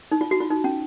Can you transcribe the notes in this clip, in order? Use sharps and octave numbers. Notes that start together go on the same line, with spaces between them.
D#4
F4
F#4
F4
D#4
C#4